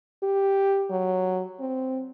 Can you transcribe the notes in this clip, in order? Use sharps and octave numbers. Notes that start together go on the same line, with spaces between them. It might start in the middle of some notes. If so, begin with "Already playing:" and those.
G4
F#3
C4